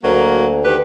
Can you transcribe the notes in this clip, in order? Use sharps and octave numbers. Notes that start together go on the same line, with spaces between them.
D2 F#3 A#3
D#3 G4 B4